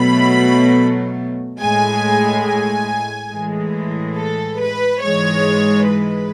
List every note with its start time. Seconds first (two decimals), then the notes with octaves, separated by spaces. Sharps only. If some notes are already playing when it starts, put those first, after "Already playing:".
Already playing: B2 F#3 A3 B5
1.60 A2 G#3 G#5
2.46 G#5
3.32 A2 E3 G#3
4.17 A4
4.60 B4
5.02 G#2 E3 G#3 C#5
5.88 B4